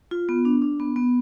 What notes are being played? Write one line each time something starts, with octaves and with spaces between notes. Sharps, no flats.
F4
B3
D4
D4
B3
B3